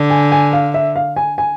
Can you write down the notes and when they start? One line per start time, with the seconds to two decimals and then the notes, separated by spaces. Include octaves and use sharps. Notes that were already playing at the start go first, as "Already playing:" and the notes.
Already playing: D3
0.10 G#5
0.32 G#5
0.53 F5
0.74 E5
0.96 F5
1.16 G#5
1.38 G#5